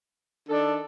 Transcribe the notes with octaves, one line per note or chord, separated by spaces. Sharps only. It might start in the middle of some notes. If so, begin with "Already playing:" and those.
D#3 D4 A4